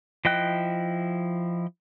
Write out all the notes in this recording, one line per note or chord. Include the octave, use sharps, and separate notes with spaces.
F3 E4 D#5 G5 F#6